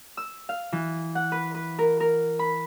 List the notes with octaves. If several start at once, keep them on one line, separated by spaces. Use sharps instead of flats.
E6
F5
E3
F#5
B4
B4
A#4
A#4
B5